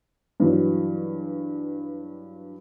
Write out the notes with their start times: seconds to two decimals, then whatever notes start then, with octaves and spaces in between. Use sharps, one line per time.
0.40 G2 E3 F#3